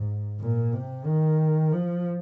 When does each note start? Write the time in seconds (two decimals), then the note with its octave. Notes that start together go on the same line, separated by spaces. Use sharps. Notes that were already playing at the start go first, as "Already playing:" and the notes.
Already playing: G#2
0.40 A#2
0.73 C3
1.05 D#3
1.72 F3